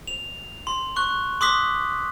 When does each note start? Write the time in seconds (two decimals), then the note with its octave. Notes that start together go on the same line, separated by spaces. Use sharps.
0.07 F7
0.67 C6
0.96 C#6 F#6
1.41 C6 D6 D#6 F#6 B6